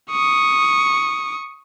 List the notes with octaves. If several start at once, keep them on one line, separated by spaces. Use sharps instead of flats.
C#6 D#6